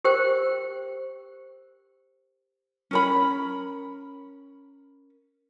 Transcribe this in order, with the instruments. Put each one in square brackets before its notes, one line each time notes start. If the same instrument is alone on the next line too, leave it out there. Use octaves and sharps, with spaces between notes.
[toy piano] G4 A#4 C5 G5
[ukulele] C#4 A#4 B5